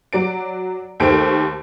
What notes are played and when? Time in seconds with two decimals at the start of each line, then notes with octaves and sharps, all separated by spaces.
0.13 F#3 D5 D7
1.00 D#2 D#3 A3 G4 C5 D7